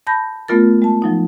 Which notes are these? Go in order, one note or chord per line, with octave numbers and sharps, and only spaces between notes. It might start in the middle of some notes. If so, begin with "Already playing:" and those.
A5 B5 G6 A#6
A3 B3 F4 A#4 A6
G#3 A5
F3 F#3 D#4